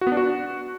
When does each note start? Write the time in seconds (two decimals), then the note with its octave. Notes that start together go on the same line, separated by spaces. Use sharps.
0.01 F#4
0.07 B3
0.12 D4
0.17 F#4